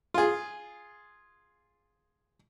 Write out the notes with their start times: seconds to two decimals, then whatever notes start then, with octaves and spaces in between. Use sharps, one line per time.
0.14 F4 G#4